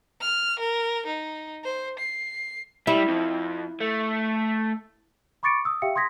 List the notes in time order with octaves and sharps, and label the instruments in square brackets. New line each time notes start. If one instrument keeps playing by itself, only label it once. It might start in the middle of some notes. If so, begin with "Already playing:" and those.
[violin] F6
A#4
D#4
C5
C7
[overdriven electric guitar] G3 [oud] E4
[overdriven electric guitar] F2
A3
[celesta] B5 C#6 D6 A6 C#7 D7
D#6 E6
G4 E5 F5 G5 C#7
C6 D#6 G#6 A#6 B6